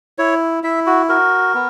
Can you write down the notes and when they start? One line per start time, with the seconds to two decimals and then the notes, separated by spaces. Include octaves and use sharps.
0.18 E4 C#5
0.64 E4 E5
0.86 F#4
1.09 F#4 A#4
1.54 B3